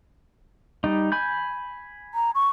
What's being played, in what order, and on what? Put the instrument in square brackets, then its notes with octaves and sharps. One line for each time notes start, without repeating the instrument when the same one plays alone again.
[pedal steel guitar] G3 D#4
G#5 B5 G6
[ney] A#5
C#6